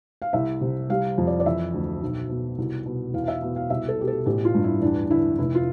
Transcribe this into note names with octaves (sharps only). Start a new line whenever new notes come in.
F5
C2 E5
C3
G3 F5
F2
D5
D5
E3 E5
D2
B1
B2
C2
B2
E2 F5
F5
E5
B2
F5
C2 E5
A4
B2 G4
A4
A1 G4
F4
G2
E4
E2 D4
D3 E4
F1 E4
F4